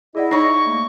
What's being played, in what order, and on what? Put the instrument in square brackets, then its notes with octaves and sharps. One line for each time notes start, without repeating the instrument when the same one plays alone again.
[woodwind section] E4 D#5 [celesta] G#4 D5 F#5
[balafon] D#4 C#5 [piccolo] C#6 [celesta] A#6
[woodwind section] A3 A#3